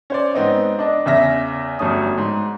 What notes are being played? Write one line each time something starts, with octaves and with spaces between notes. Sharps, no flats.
C#4 C5 D5
G#2 B3 C4 D#4
D4 D#5
E2 C#3 E5 A#6
G1 F#2 A3 C#4 D#6
G#2